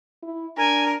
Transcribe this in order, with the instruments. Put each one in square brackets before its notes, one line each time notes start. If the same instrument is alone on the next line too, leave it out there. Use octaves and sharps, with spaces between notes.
[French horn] E4
[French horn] D4 [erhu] A#4 [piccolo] G#5